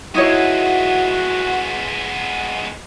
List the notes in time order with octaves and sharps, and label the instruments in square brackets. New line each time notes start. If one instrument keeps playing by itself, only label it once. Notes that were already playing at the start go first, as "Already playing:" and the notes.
[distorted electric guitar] G#3 B3 [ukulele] D#4 E4 C#5 [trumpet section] F#4